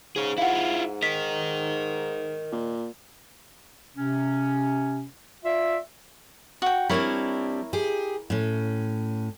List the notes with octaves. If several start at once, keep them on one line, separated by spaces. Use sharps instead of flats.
G#2 G#4 C#5
E4 F4 F5 F#5
A#4 D#5 B6
A#2
C3 C#4
F4 D5 E5
F#4 G5
G3 C4 D4 E4 A#4 C#5
G4 G#4
A2 C#4